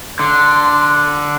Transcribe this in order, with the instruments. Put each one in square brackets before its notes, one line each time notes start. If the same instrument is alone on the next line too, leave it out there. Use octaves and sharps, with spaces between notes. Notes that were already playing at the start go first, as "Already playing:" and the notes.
[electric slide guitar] D3 [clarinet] C6